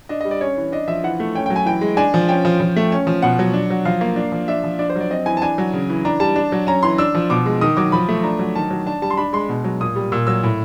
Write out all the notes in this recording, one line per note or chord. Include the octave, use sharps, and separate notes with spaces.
D4 D#5
D#5
G3
D5
C#4 C#5
E3
D4 D#5
F3 E5
E3 F#5
A3
C#4 G5
G5
F#3
G#5
E3 G5
G#3
D4 G#5
F3
C#4 G5
F3
F3
A3
C#4
F3
B2 F#5
F#3
D4
F#3
F3 F5
A#3
D4
F3
D4 E5
F3
D4 D5
C5
F#3 D5
C4 D#5
E3 G#5
A5
D4 G#5
F#3
C#3
E3
D4 A#5
G3 A5
D4
F#3
C#4 A#5
E3 C6
D4 E6
F3
B2 D6
G#3
D#3 D#6
F#3 D6
F3 B5
A3
D4 A#5
F#3
D#3 A5
F#3
D4 A5
G3 A5
C6
D4 B5
G#3 C6
B2
F#3
A#2 D#6
G3
A#2 E6
F#3 E6
A2